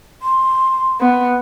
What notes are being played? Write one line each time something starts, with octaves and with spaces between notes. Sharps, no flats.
C6
B3